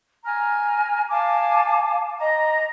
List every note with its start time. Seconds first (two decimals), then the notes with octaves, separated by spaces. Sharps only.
0.25 G#5 A#5 F6
1.10 F5 G#5 A5 D6
2.20 D#5 A#5